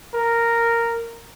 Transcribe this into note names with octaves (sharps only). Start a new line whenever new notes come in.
A#4